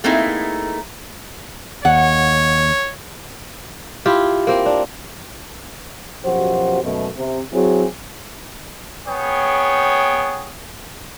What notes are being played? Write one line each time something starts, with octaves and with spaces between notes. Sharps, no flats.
A3 A#3 C4 D#4 E4 G#4
D#2 C#5 F#5
E4 F4 G4
A#3 C4
D4
F#2 B2 F3 F#4 G4 C5
F#2 B2 A3
C3
F#3 C4 E4 G#4
B3 G#4 C#5 G5